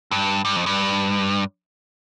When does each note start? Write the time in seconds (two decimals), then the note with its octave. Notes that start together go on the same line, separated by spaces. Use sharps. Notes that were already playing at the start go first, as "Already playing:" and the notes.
0.11 G2
0.45 G2
0.56 F2
0.66 G2